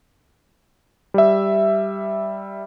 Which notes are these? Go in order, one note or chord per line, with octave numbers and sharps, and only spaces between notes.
G3 E5